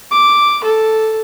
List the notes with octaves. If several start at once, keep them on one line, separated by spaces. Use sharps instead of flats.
D6
A4